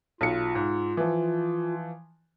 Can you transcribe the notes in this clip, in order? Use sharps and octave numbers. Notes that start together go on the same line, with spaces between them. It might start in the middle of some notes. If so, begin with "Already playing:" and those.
B1 F4 C#7
G#2
E3 F3